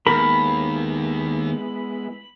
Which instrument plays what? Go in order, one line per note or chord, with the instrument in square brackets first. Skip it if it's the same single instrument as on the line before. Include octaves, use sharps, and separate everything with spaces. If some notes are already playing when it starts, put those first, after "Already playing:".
[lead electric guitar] D#2 [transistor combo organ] G#3 B3 E4 [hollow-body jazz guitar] A#4 [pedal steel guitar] B5